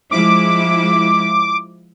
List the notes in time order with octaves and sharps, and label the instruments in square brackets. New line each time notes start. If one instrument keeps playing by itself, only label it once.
[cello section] F3 G#3 E4 [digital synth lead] D6